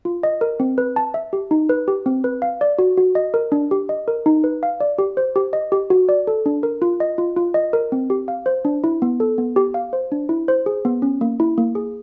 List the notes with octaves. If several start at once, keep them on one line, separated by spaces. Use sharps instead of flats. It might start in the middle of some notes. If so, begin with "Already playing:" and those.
F4
D#5
A#4
C4
B4
A5
E5
G4
D#4
B4
G4
C4
B4
F5
D5
F#4
F#4
D#5
A#4
D4
G4
D#5
A#4
D#4
B4
F5
D5
G4
C5
G4
D#5
G4
F#4
D5
A4
D4
A#4
F4
D#5
F4
F4
D#5
A#4
C4
G4
F5
C5
D4
E4
B3
A4
B3
G4
F5
C5
D4
E4
C5
G#4
B3
C#4
A#3
E4
A#3
G#4